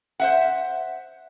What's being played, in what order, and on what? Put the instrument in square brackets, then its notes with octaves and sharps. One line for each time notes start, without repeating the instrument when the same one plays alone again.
[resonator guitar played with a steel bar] C5 E5 F#5